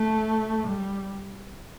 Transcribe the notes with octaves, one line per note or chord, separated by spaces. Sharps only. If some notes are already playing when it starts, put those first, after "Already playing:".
Already playing: A3
G3